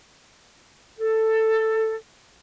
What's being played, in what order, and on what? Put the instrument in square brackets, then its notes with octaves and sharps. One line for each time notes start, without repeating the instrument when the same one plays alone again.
[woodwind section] A4